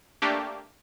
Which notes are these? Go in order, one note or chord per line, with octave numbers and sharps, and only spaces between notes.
A3 A#3 D4 G4